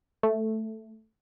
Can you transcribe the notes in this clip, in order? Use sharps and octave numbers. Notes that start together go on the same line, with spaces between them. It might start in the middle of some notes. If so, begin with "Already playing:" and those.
A3